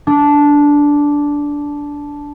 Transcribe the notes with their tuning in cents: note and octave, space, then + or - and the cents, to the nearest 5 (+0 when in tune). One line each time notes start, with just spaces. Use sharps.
D4 -10